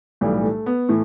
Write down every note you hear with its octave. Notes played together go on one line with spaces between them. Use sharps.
B1 A2 E3 G3
A3
B3
A2 E3 A3